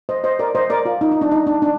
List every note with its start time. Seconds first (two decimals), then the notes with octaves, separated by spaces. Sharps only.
0.09 C5 D#5
0.24 C5 D#5
0.39 A#4 D5
0.55 C5 D#5
0.70 A#4 D5
0.85 F4
1.01 D#4
1.11 D#4
1.21 D4
1.32 D#4
1.47 D4
1.62 D4